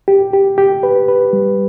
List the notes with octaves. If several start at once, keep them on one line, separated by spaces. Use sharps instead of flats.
G4
G4
G4
B4
B4
G3